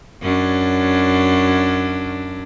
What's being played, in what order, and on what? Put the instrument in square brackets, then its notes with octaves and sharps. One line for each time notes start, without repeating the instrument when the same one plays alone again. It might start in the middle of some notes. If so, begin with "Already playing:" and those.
[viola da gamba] F#2 C#4 D4